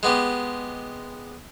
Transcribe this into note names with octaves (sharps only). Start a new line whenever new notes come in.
G#3 B3 G4